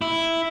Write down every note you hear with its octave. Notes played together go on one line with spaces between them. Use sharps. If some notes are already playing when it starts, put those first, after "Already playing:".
E4